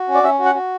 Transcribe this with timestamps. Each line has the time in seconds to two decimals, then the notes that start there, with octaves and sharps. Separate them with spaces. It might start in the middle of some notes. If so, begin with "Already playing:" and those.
Already playing: F#4
0.08 C#4
0.14 D5
0.23 C#4 E5
0.39 F#4
0.45 F#5
0.54 F#4